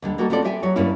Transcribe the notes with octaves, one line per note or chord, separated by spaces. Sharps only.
D#2 D3 G3
G3 A#3 D#4 F#4 A4
B3 C4 F4 G4 A4 D5
G4 E5 G5 G#5
F#3 G4 C#5
G2 G3 A#3 C#4 E4